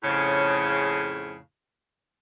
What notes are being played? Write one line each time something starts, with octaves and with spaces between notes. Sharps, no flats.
F2 A2 C#3